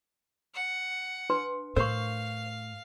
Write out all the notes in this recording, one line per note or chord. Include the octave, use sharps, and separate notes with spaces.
F#5
D4 B4 C6
A2 A#4 C5 F5 C#6